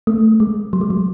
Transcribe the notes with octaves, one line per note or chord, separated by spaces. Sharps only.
A3
G#3
F#3
G#3
F#3